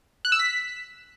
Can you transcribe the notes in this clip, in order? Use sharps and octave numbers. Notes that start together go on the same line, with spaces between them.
F#6
E6
B6